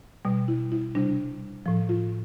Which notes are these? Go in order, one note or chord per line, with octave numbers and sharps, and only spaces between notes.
B2 G3
E4
E4
C3 G3 D4
A2 F3
F4